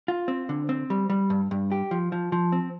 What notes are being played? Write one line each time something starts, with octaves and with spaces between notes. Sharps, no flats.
F4
C4
D3
C4
G3
G3
G2
G2
G4
F3
F3
F3
C4